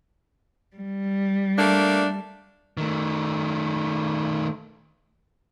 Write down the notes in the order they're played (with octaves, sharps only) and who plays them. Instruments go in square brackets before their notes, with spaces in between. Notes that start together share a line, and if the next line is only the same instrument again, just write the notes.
[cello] G3
[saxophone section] A3 A#3 D4
[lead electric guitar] D#3 A3